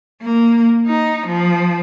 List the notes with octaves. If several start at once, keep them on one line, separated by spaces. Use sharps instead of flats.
A#3
D#4
F3